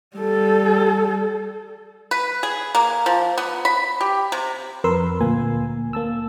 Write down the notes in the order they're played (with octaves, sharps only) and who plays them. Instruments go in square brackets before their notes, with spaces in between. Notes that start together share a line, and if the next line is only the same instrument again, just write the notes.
[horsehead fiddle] G3 A4
[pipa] B4
G#4
A#3
F3
B3
B5
G4
C3
[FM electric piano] F2 A#4 B4 C6 E6
D2 A#2 A#3 G#5
A#3 A5 E6